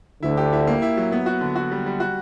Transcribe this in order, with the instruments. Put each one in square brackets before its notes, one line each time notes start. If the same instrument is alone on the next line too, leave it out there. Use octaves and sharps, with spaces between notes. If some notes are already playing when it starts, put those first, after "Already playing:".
[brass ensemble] D2 D3 [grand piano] E4
[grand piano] G4
E4
A#3
E4
F#3
B3
F#4
D3
F#4
G3
G3
F#4